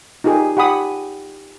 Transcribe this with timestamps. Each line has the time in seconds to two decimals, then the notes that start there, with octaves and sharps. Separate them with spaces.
0.24 D#4 F4 G4 G#4
0.57 G4 F#5 B5 D#6